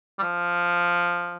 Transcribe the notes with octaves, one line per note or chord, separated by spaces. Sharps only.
G3
F3